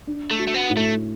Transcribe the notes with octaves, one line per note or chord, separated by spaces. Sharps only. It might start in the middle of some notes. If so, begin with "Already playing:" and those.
D4
A3
F#4
A3
B3
A2
A3